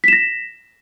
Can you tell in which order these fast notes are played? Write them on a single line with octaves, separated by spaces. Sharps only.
B6 E7 A#6